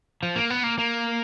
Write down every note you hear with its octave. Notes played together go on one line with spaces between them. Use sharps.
F3
A#3
B3
A#3
A#3